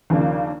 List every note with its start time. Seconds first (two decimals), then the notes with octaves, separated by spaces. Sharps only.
0.10 D#2 C#3 F3 A#3 D4